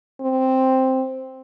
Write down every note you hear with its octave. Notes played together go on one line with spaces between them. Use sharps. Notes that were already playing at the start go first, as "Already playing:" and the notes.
C4